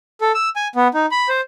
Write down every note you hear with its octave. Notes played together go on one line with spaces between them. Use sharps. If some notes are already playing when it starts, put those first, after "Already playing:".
A4
E6
G#5
B3
D#4
B5
C5